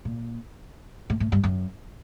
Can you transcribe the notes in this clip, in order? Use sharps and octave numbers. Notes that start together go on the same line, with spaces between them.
A#2
A2
A2
G2
F#2